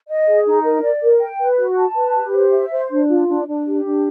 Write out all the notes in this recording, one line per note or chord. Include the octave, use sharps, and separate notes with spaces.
D#5
G#4
D#4
A#4
D5
A#4
G5
B4
F#4
A5
B4
G4
C5
E5
C5
D4
F4
D4
D4
G4
D4